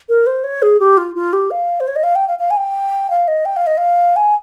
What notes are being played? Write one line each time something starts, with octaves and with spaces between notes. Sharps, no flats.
A#4
C5
C#5
G#4
G4
F4
F4
G4
F5
C5
C#5
D#5
F5
G5
F5
F5
G#5
G5
F5
D#5
G5
F5
D#5
F5
G#5